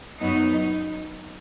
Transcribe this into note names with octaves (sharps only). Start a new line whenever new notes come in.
F#2 F#3 B3 D#4